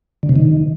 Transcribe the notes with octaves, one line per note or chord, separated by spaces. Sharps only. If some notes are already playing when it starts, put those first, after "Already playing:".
D3
C3
D#3